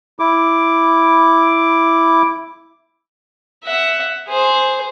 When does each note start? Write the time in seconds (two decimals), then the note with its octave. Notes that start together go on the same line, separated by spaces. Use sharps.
0.19 E4 D6
3.64 E5 F#5
4.27 G#4 C5